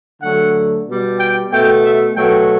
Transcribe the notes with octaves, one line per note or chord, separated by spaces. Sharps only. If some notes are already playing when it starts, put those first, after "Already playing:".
D3 F#3 A3 F#5
B2 G3
G5
B2 A3 G5
E5
B2 F#3 A3 G5